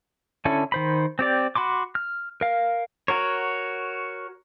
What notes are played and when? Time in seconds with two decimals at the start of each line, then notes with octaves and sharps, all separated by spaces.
0.45 D3 C#4 E4 A4
0.72 D#3 C5 B5
1.19 C4 G4 D5
1.55 F#4 B5 C6 D6
1.95 F6
2.41 A#4 F5
3.08 F#4 A#4 C#5